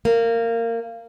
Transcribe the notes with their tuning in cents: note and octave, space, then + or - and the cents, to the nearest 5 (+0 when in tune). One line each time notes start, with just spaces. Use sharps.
A#3 -20